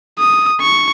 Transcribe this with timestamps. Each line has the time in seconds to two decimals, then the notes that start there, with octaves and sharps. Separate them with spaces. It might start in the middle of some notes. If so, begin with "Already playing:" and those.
0.19 D#6
0.61 C#6